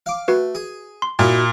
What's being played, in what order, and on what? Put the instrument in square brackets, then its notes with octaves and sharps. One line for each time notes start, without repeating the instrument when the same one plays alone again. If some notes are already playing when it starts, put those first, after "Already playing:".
[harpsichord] F5 D6
[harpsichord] A3 [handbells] F#4 B4
[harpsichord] G#4
[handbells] C6
[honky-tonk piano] A#2 [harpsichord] D#4 E4 F#4